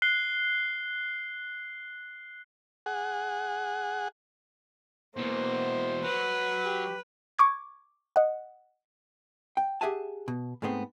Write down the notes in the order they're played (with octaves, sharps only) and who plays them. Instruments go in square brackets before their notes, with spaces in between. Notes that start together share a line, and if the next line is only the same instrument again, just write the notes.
[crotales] F#6 C7 G7
[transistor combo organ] G#4 F#5
[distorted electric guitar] B2 E3 [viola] A#3 [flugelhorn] C5
[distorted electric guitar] F#3 [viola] B4
[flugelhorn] G4
[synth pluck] C#6 D6 G#6
D#5 F#5
[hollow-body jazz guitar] G5
G4 G#4 E5 F#5 G#5 A5
B2
G#2 G#3 A3 B3 C4